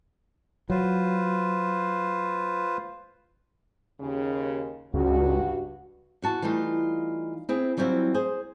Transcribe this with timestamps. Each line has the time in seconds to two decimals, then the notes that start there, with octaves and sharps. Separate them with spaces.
0.70 F#3 F4 B4 C5
4.00 D#2 C#3
4.94 C#2 G2 F#4
6.22 E2 F#4 A5
6.42 E3 G3 A3 D#4 F4
7.49 C4 E4 G#4
7.77 E3 F#3 G3 C4 E4 F4
8.14 G#4 C5